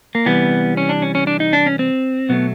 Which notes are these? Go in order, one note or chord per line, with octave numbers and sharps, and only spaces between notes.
A#3
C3 E3 G3 B3
C#4
D4
C#4
C#4
D4
D#4
D4
C#4
C4
B2 F#3 A3 B3